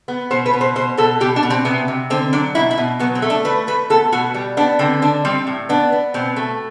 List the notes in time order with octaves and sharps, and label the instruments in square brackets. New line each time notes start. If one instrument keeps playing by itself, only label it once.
[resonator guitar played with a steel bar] B3
B2 C5
B4
B2
C5
B2 C5
B2 A4
B2 G4
D4
B2
C4
C3 B3
C3
D3 C4
F#3 D4
B2 E4
E4
B2
F#3 B3
C4
A3
D4
A3 B4
A3 B4
B3 A4
B2 F#4
G3
B3 D4
D3 C4
D3 D4
G3 C4
A2
B3 D4
B3
B2 C4
A3